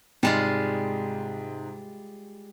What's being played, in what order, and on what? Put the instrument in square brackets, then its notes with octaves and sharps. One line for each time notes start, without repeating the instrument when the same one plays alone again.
[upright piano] G#2 C3 [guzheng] G3 G#3 F4